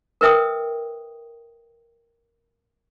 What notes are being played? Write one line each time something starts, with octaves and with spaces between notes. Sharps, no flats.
A#4 B4 E5 G5 D#6